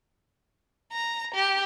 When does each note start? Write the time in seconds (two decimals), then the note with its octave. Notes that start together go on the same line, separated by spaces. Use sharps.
0.92 A#5
1.34 G4